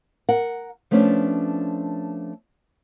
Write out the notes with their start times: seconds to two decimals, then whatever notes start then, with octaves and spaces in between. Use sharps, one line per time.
0.29 A#4 F#5
0.91 F3 A3 B3 C#4 D4